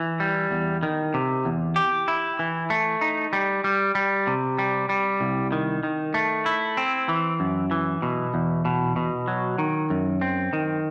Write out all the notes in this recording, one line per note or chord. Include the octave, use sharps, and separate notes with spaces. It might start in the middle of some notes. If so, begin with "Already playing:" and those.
Already playing: E3
G3
E2
D#3
C3
E2
G4
E4
E3
A3
D#4
G3
G3
G3
C3
G3
G3
C2
D#3
D#3
A3
E4
C4
E3
F#2
E3
B2
E2
B2
B2
F#3
D#3
F#2
C4
D#3